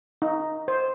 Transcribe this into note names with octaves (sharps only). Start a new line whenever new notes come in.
D#4
C5